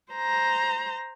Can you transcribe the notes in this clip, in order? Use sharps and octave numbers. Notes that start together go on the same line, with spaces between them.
C5 A#5